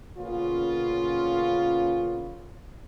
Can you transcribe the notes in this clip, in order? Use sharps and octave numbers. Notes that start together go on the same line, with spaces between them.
A#2 C#3 B3 C#4 F4